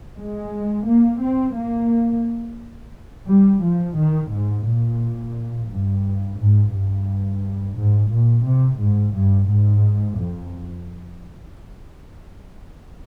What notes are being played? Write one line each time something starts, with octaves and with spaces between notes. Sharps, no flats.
G#3
A#3
C4
A#3
G3
F3
D#3
G#2
A#2
G2
G#2
G2
G#2
A#2
C3
G#2
G2
G#2
F2